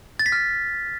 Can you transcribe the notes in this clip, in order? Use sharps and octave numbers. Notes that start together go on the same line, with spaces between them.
A6
B6
F6